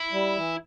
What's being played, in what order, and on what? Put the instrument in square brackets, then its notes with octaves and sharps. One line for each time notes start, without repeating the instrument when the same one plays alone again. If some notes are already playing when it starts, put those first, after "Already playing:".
Already playing: [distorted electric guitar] E4
[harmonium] G3
E3